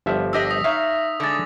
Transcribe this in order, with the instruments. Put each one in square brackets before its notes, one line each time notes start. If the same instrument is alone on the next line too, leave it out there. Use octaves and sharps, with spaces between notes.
[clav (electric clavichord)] G1 F3 E5
[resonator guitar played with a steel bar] D4 G4 D#5 [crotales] E6 A#6 B6
[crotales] D#6 A#6
[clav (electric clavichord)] D#4 C#5 F5 [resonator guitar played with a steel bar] E5
[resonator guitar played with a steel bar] D3 G#3 [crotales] D6 A6